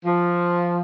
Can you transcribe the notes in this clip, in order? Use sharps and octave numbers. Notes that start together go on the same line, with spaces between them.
F3